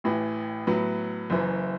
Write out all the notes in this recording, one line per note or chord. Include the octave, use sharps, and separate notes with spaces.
A1 A2 E3
A2 F#3 B3
F#1 F#2 E3